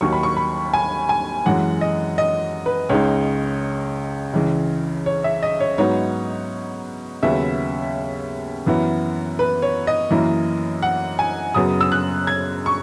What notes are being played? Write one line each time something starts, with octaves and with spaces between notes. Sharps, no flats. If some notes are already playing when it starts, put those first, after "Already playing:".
D#2 D#3 F#3 C#6
B5
C#6
B5
G#5
G#5
F#2 E3 G#3 F#5
D#5
D#5
B4
C#2 C#3 G#3 D#4 C#5
C#2 C#3 E3
C#5
E5
D#5
C#5
G#2 F#3 B3 D#4 C#5
D#2 C#3 F#3 B3 E5
F#2 E3 B3 E4
B4
C#5
D#5
F#2 E3 A#3 E4
F#5
G#5
F#2 C#3 F#3 B3 D#6
E6
F#6
G#6
C#6